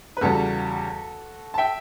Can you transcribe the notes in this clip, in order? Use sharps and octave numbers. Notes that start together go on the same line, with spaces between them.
B4
E2 C#3 G3 F#4 A4
A5
E5 G5